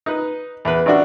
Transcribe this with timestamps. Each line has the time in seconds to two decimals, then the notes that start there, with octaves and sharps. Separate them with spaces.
0.06 D#4 B4
0.65 E2 B4
0.86 A1 D4 F#4